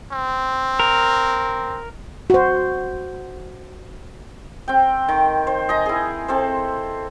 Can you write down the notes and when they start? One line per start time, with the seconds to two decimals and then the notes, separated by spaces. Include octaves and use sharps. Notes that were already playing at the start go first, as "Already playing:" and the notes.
0.12 C4
0.80 A#4
2.30 F#4 C5
4.68 C4 G5
5.08 D#3
5.47 C5
5.69 D#5 G#5 A#5
5.86 E4 G#4
6.28 C4 A4 C5